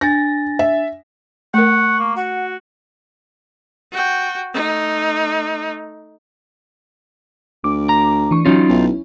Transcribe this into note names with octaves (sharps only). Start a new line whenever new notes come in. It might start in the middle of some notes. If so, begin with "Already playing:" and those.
D4 G#5 A6 A#6
E5
A3 A#4 F#5 C#6
A#3
F#4 F#5
F#4 G5
A3 D#4
D2 D6
A#5
E3 D4 C#6
F#3 C#4 D#4 F4
B1 C#4 E4